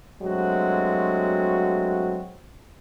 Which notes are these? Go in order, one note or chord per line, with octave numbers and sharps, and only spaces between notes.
G2 F#3 G#3 A3 C4 F#4